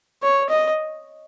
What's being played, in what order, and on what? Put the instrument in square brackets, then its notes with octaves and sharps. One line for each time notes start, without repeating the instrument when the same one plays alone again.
[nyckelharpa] C#5
D#5